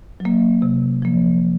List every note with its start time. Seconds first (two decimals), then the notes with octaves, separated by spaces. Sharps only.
0.20 F#3
0.25 A#3
0.62 C3
1.02 F3 A#3